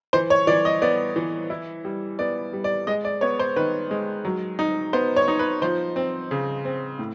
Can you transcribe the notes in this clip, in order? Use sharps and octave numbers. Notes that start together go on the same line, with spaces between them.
E3 C5
C#5
E3 D5
D#5
B3 D5
E3
E4
G3
B3 D5
G3
D5
G#3 D#5
D5
B3 C#5
C5
D#3 B4
G#3
F#3
D#4
B3 C5
C#5
D#4
B4
F3 C5
C4
C#3
C4
A2